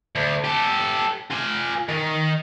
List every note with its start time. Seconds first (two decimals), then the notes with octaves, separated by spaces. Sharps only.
0.16 D2
0.44 G4 A4
1.30 F4 G#5
1.89 D#3